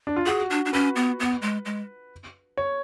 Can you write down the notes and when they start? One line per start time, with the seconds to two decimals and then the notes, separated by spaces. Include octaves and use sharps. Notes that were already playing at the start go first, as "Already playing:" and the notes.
0.07 D4
0.16 F4
0.26 F#4 G#4
0.50 D4
0.65 D4
0.73 C#4 B4
0.96 B3
1.20 B3
1.42 G#3
1.65 G#3
2.57 C#5